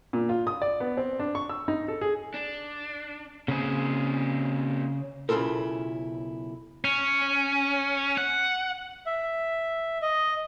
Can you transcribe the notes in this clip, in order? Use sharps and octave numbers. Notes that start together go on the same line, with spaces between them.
A#2
F4
D#6
D5
B3
C4
D4
C#6
E6
D#4
A4
G#4
D4
A#2 C#3 C4 G#4
B1 C#3 E4 F4 A4 A#4
C#4
F#5
E5
D#5